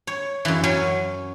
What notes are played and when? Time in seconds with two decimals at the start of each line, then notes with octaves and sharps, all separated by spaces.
0.07 C#5
0.45 F#2 E3
0.64 F#3 C#4 G#5